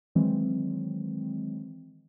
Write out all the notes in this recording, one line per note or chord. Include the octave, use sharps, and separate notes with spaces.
D#3 E3 F#3 G#3 C4